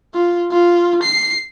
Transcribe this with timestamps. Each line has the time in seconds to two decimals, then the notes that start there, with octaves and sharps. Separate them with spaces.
0.14 F4
0.51 F4
1.02 C7